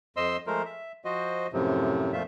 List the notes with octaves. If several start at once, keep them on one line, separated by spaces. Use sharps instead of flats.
F2 C5 D#5 C6 E6
F3 G#3 A3 A#4 C5
E5
F3 F#4 C5 D#5
F#2 A2 C3 F3 F#3
F2 A#2 F3 A3 F4 E5